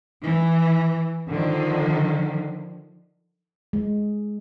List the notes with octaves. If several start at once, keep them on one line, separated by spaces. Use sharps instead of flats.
E3
D3 D#3 F3
G#3